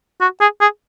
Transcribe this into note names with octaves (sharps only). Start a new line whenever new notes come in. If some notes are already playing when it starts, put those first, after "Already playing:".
F#4
G#4
G#4